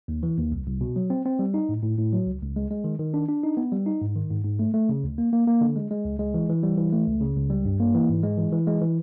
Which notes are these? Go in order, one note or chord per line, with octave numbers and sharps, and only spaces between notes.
D#2
E3
D#2
C2
C2
B2
F#3
C4
C4
G3
D#4
A2
A2
A2
F#3
C#2
C#2
G#3
G#3
D#3
D#3
D4
D4
D#4
B3
G3
D#4
G#2
D#3
G#2
G#2
A3
A3
C#3
D2
A#3
A#3
A#3
D3
G#3
G#3
C#2
G#3
E3
E3
G3
E3
A3
C#2
C#3
C#2
G3
G2
A#3
E3
G#2
G#3
E3
E3
G#3
E3